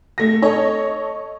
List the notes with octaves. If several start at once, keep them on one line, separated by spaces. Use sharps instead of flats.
A3 A#6
A4 C#5 D#5